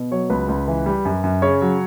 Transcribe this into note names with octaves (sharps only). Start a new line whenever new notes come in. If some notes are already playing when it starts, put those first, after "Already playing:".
Already playing: B2
F#3 C#5
C#2 B4
C#2
E3
G3
F#2
F#2
C#3 C#5
F#3